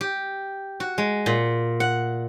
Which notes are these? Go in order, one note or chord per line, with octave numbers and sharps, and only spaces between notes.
G4
F#4
G#3
A#2
F#5